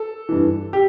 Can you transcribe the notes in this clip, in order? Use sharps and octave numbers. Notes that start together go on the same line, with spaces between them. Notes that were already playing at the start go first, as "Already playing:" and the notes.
Already playing: A4
G2 E3
G4